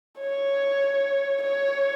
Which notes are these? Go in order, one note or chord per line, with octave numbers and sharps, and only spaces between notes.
C#5
C#5